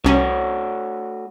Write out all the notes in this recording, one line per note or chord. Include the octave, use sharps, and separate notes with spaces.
C2 A3 C#4 F#4 C#5